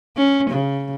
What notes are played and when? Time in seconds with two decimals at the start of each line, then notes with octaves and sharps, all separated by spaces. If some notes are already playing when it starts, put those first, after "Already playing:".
0.17 C#4
0.50 C#3